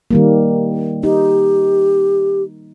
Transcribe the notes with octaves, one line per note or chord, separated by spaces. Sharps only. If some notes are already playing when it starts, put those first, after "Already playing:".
D#3 G3 A#3
D#4 G4